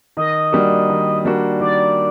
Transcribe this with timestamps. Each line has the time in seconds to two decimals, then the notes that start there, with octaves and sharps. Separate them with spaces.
0.17 D#3 D#5
0.52 G3 A#3 D4 F#4
0.90 D#3
1.25 G3 A#3 D4 F#4
1.60 D#3 D5